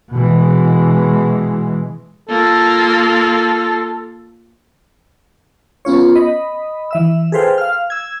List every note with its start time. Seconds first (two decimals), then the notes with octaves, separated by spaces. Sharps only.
0.13 B2 E3 G#3
2.29 A#3 F4 A4
5.85 B3 C#4 F4 C#5
6.15 D#5 B5
6.91 E3 E5 E6
7.32 G#4 A4 B4 C5 F5 G5
7.58 F5 F6
7.90 E6 G#6